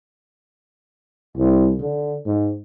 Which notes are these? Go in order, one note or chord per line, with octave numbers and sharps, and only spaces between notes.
C2
D3
G#2